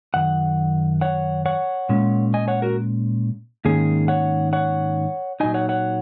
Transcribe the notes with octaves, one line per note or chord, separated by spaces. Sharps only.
F#2 D#3 F#5
C#5 F#5
C#5 F#5
A#2 G#3 C#4
D#5 G#5
C#5 F#5
F#4 A#4
G#2 D#3 A#3 C#4 G#4
C#5 F#5
C#5 F#5
A#2 F#3 D#4 D#5 G#5
C#5 F#5
C#5 F#5